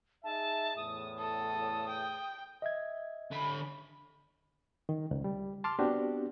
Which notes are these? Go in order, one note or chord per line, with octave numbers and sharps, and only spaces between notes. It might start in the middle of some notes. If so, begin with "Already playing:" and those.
D#4 G#4 E5 A5
E2 A2 D#6
A4 D#6
G5
D#5 E5 G#6
D3 B5
D#3
C#2
G3
A5 C6 D6 F6
B3 C4 D4 F#4 G4